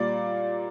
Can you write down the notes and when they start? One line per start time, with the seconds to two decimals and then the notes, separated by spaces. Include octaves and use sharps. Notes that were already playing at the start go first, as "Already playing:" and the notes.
Already playing: A#2 G3 A#3 D5